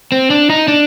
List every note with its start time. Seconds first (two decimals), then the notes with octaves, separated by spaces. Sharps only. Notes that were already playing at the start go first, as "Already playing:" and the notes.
0.12 C4
0.30 D4
0.50 D#4
0.68 D4